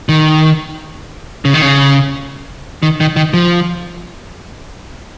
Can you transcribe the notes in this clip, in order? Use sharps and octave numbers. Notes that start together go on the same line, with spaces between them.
D#3
C#3
D#3
C#3
D#3
D#3
D#3
F3